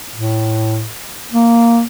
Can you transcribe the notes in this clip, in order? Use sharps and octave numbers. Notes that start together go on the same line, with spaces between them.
A2
A#3